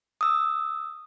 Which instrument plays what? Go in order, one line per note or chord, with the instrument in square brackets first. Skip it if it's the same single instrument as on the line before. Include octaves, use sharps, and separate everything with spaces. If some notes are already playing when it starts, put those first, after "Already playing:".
[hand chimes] D#6 E6